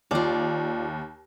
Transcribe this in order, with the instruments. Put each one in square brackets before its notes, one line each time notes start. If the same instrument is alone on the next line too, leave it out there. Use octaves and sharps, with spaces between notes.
[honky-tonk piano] D#2 [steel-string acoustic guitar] F4 D5